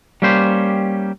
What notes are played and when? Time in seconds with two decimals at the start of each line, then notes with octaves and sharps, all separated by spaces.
0.22 G3 A#3 C#4 G4 C5